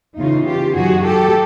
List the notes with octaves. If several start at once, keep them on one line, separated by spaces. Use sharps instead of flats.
E2 C#3 E3 D#4 F4
F4 G4
F#2 D#3 F#4 G#4
G4 A4